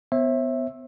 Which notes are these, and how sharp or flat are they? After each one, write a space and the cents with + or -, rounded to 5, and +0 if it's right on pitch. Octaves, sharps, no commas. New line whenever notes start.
B3 +20 C5 +45 E5 +0